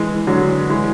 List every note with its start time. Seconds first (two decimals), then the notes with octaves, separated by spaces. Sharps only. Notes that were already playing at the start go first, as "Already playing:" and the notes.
Already playing: E3 G#3
0.27 D3 F#3
0.70 E3 G#3